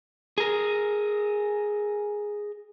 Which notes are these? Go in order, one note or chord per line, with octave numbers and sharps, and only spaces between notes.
G#4 A#4